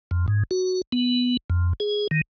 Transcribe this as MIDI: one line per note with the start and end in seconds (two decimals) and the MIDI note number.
0.11 0.26 41
0.28 0.43 44
0.51 0.82 66
0.92 1.37 59
1.50 1.73 41
1.80 2.07 68
2.11 2.21 51